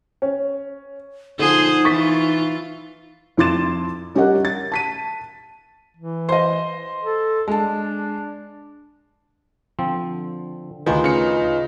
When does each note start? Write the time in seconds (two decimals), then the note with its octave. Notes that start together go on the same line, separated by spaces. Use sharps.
0.22 C#4
1.39 D3 F3 D#4 G#4 C5
1.85 E3 F4 C#6 A6 B6
3.37 F2 E4 C6 D6 A6 E7
4.15 G3 C#4 G4 A#4 D#5 F#5
4.45 A6
4.72 A5 B6 D#7
5.97 E3
6.29 C5 D#5
7.03 A4
7.48 G#3 D4 A5
9.79 D3 F3 C4
10.86 D2 D#3 D#4 F4 G#4 B4
11.04 C#3 D#5 C#7